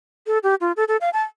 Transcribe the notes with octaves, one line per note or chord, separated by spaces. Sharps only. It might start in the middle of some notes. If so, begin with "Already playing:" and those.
A4
G4
F4
A4
A4
F5
A5